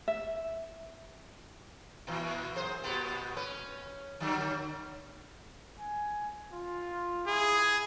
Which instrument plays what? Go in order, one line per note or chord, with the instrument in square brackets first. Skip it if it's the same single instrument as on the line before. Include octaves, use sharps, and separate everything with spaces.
[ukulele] E5
[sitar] A#2 E3
F#2 G#4 C5
A#2 B3 G4
C#4 B4
D3 F#3 G3
[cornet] G#5
F4
[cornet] E4 [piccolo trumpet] G#4